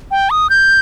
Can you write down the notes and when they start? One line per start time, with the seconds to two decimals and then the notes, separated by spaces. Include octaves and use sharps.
0.11 G5
0.30 D#6
0.50 G6